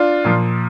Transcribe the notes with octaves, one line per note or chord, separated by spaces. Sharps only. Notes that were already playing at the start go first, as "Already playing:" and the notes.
Already playing: D4 F4
A#2 F3